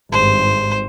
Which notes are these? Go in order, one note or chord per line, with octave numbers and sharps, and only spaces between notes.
G#1 G2 C5